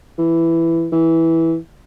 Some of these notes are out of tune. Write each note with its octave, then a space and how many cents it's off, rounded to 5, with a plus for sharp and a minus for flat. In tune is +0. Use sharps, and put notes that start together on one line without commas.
E3 +10
E3 -10